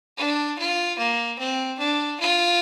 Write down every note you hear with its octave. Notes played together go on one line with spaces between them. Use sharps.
D4
F4
A#3
C4
D4
F4